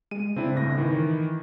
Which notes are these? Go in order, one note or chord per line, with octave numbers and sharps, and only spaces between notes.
G#3 D#7
C#3 C4 D4 E4
G1 A2 A#6
D#3 E3